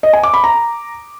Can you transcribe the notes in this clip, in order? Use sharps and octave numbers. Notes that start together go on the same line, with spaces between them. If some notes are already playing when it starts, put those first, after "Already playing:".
D#5
G#5
D6
B5
A#5